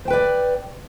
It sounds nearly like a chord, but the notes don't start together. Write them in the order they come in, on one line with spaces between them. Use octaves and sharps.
C5 G5 B4 D5